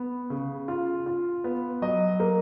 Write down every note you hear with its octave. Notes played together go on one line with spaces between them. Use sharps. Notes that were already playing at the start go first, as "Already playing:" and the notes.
Already playing: B3
C#3
F4
F4
B3
F#3 D#5
A#3